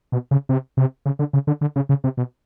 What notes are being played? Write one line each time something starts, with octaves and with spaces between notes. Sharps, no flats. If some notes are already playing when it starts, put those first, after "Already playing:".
B2
C#3
C3
C3
C#3
D3
C#3
D3
D3
C#3
C#3
C3
B2